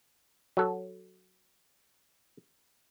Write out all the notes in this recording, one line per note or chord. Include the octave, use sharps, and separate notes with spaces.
F#3 A4